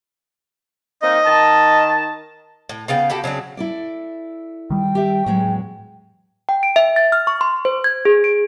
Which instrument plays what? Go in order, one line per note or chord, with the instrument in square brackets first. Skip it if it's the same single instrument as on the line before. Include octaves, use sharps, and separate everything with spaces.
[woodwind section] A#3 C4 D#4 [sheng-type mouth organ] D#5
[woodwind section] D#3 A5
[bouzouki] A2
C#3 B3 F5 G5
E4 F#4 G4 A4
C#3 F#3 C4 D4
[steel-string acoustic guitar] E4 A4 D5
[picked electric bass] D#3 G3 [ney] G5
[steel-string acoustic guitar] G4 E5
[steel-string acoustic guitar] E2 F#3 G#3 [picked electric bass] A2
[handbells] G5
D7
E5
A6
F6
C#6
C6
C5
G#6
G#4
D7